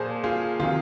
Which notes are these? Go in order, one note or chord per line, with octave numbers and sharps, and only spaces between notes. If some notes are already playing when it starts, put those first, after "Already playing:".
Already playing: A#2 F3 G#4 C5
F4 G#4
C3 D#3 F4 G#4